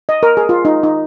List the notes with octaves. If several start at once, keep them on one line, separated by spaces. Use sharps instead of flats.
D#5
A#4
G#4
F4
D#4
D#4